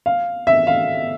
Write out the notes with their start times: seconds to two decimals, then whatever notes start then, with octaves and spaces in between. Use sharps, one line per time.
0.06 F5
0.47 E5
0.67 F5